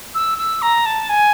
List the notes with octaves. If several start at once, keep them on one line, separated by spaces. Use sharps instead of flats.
E6
E6
A#5
A5
G#5